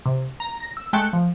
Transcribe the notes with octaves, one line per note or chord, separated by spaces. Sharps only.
C3
A#5
A#6
E6
G#3 A3 G5 A5 F#6 C#7
F3